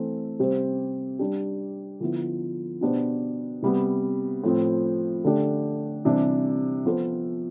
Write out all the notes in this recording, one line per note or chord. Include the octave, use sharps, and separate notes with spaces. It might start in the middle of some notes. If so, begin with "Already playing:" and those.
Already playing: E3 A3 C4
C3 G3 C4 G4 C5
G3 D4 G4
D3 F3 B3 E4
B2 B3 D4 G4 C5
C3 G3 B3
A2 F3 C4
D3 A3 D4 G4
C3 E3 G3 D4
F3 B3 F4 A4 C5